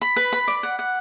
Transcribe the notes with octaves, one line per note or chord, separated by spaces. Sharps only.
B5
B4
B5
D5
F#5
F#5